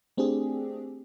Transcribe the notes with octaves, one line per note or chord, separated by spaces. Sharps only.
A3 C4 D4 G4 G#4